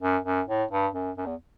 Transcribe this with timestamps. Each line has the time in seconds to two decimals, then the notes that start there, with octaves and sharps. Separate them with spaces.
0.01 F#2
0.25 F#2
0.48 A2
0.71 G2
0.95 F#2
1.18 F#2
1.26 E2